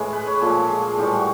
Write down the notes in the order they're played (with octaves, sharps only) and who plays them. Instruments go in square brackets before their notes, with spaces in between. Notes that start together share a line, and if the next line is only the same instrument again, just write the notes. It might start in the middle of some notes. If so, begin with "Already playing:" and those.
Already playing: [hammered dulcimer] A2 E3 G#3
B4
C#5
A#2 F3 G#3 A4
G#4
A2 E3 G3 G4
F#4